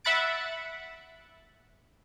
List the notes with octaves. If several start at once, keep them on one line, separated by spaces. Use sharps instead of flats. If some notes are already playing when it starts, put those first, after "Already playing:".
E5 F#5 B5 F#6 A6 D7